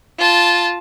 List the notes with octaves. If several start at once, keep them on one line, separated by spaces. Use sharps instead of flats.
F4 A5